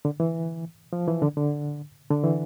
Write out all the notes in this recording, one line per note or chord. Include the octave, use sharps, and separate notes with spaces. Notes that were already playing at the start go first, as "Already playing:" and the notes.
D3
E3
F3
E3
D3
D3
D3
E3